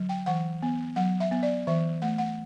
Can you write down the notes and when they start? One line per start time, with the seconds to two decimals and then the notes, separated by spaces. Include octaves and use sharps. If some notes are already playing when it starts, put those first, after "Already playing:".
Already playing: D3 F#3
0.09 G5
0.26 E3 F#5
0.62 B3
0.96 F#3 F#5
1.20 E5
1.31 B3
1.43 D5
1.67 E3 E5
2.02 A3 F#5
2.18 F#5